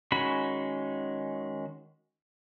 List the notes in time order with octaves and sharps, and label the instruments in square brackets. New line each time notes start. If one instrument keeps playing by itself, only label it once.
[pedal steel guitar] D#3 G#3 C#4 F#4 B5